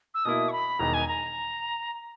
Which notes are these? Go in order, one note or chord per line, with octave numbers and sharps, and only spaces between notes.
E6
B2 A#3 E4 D#6
C#6
B5
E1 E2 D#3 A#5
G#5
A#5